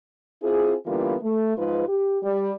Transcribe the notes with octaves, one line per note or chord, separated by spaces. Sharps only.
C4 E4 F4 G#4
D3 E3 G3 A#3 B3 F4
A3
G#2 F3 G#3 F4 B4
G4
G3